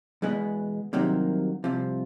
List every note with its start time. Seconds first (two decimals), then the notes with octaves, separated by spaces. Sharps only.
0.22 E2 B2 G#3 B3
0.93 C2 C3 D#3 F#3 A#3
1.64 C2 C3 F3